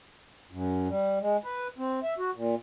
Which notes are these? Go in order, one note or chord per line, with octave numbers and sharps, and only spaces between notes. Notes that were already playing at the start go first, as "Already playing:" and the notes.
F#2
G3
G#3
B4
C4
E5
F#4
A#2